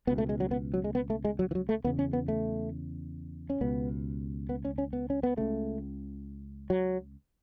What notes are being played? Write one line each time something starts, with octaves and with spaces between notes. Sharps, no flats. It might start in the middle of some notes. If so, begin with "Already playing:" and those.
C#2 B2 B3
A3
G#3
F#3
B3
F#3
G#3
B3
A3
G#3
F#3
E3
F#3
A3
E2 C#3 B3
C#4
B3
A3
C#4
C#2 B2 B3
B3
C#4
C#4
B3
C#4
B3
C#2 C#3 A3
F#3